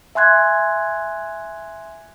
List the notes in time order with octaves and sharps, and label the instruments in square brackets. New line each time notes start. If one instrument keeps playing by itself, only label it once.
[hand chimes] E5 G#5 C6 F#6 G#6